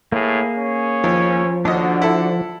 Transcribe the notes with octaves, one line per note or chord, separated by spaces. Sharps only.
A2 A#3 G#4
C#4
D#2 F3
D#2 D3 D4 F#4 D#5
E4 A4